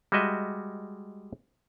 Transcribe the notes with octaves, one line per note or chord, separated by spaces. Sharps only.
G3 G#3 F#4 D#5 E5